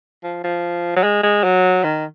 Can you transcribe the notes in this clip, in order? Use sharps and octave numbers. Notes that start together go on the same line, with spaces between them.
F3
F3
F#3
G#3
G#3
F#3
D#3